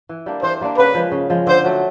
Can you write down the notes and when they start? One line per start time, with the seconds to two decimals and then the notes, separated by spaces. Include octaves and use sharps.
0.09 E3
0.26 G3 A#3 D4
0.43 E3 C5
0.61 G3 A#3 D4
0.78 C#3 B4
0.94 F3 G#3
1.12 C#3
1.30 F3 G#3
1.47 D3 C5
1.64 F#3 A3